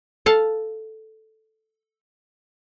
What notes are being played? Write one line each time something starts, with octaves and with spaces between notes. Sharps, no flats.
A4 F5 A5